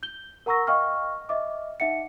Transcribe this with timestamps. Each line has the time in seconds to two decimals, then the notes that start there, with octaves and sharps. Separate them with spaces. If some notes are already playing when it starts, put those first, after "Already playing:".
0.03 G6 G7
0.46 A#4 F#5 A#5 C#6 E6 A#6
0.67 D#5 F5 G5 C#6 F6
1.29 D#5 E5 D6
1.80 D#4 E5 F#5 C#7